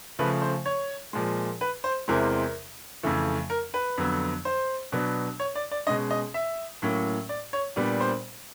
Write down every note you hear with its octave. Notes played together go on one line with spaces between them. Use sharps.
C#3 F3 A3 B4
C5
C#5
A#2 F3 G#3
B4
C5
E2 C3 E3 G#3 C4 A#4
F2 C#3 E3 A3
A#4
B4
F2 D3 F#3 B3
C5
B2 F#3 B3 D4
C#5
D5
D5
B2 G#3 C#4 D#5
D#5
E5
A2 F#3 A#3 C#4
D5
C#5
A#2 G3 B3 D4
C5